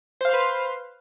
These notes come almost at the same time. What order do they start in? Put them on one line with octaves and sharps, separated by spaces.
C5 F5 C6 B4